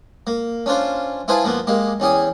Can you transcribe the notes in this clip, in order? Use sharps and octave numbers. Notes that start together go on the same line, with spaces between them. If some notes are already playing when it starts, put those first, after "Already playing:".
A#3
C#4 D4 F4 C5
E4 F4 G#4 B4 C5 A5
F3 A#3 B3
G#3 A#3 G4
E2 C#4 G4 G#4